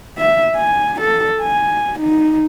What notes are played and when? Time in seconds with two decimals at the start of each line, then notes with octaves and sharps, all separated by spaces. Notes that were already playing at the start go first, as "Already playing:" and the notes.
0.18 E5
0.56 G#5
1.01 A4
1.42 G#5
2.00 D#4